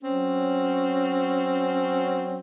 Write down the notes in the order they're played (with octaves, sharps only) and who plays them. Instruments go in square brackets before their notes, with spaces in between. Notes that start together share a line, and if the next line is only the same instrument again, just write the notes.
[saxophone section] F#3 C4 C#4